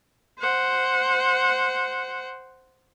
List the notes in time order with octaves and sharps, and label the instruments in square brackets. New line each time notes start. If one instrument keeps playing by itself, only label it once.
[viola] C5 F#5